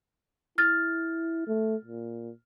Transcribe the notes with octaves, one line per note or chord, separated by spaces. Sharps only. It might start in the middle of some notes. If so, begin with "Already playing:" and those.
E4 F6 A6
A3
A#2